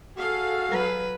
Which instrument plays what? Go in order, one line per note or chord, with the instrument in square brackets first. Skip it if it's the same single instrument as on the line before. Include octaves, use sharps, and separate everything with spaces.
[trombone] F#4 [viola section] G#4 A4 F5
[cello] F#3 B4